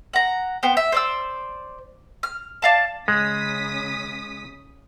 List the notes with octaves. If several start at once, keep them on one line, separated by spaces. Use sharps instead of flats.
F#5 A#5
B3 C5 G5
E5
C5 D5 E6
F6
D5 F5 A5
C#3 G#3 D#6 B6